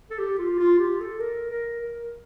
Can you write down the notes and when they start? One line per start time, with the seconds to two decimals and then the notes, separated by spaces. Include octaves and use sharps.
0.10 A4
0.19 G4
0.39 F4
0.59 F4
0.79 G4
1.01 A4
1.20 A#4
1.51 A#4
1.81 A#4